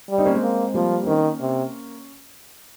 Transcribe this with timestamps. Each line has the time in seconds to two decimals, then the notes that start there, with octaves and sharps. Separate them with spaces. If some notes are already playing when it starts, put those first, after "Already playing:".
0.10 G3
0.18 C4 D#4
0.25 A#3 C#4
0.34 G#3 C4
0.42 A#3
0.74 F3 G3 A#3
1.03 C4
1.07 D#3 A#3 C#4
1.41 C3